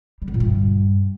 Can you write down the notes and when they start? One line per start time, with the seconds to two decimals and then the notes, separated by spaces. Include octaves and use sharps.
0.22 G3
0.28 B3
0.34 A#2
0.40 G2